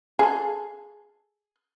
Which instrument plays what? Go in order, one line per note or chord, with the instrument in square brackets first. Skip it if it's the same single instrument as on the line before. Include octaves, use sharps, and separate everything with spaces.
[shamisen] G#4 A4